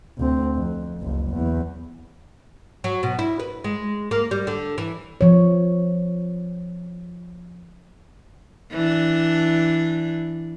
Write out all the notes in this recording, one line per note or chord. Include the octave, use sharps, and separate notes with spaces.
D2 C4
F2
F#1 C#2
E2
F#3
B2
E4
B4
G#3
A#3
G3
D3
E3
F3 C#5
E3 D4